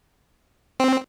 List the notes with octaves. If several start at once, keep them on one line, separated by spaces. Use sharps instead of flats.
C4